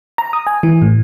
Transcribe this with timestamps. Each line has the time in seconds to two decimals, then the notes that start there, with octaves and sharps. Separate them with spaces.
0.18 A#5
0.33 D#6
0.47 G#5
0.63 E3
0.82 A2